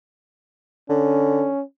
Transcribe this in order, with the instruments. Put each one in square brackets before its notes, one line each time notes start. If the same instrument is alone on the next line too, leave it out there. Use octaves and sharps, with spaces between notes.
[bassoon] D3 [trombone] C#4